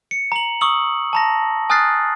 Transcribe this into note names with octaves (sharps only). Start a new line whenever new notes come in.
C#7
A#5 F#7
C#6 D#6 E6 F#7
A5 A#5 A#6
G#5 D#6 F6 F#6 A6 C7